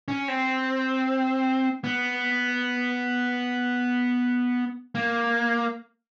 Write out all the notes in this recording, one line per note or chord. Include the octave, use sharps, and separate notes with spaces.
C#4
C4
B3
A#3